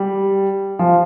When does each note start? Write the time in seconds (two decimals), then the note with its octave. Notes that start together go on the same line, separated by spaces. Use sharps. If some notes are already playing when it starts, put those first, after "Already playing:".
Already playing: G3
0.79 F3